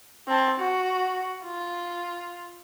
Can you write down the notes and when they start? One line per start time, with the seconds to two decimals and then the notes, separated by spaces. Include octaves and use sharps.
0.28 C4 A5
0.60 F#4
1.44 F4